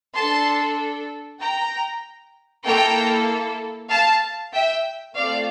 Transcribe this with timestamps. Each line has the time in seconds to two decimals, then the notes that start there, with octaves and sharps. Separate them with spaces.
0.15 D4 A4 A5 C6
1.40 G5 A#5
2.65 A#3 E4 A4 G5 A#5
3.90 F5 A5
4.52 E5 G5
5.15 A3 C4 F4 A4 D5 F5